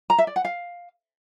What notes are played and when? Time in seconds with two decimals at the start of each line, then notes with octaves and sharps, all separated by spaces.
0.10 A#5
0.18 E5
0.27 D5
0.36 F#5
0.45 F5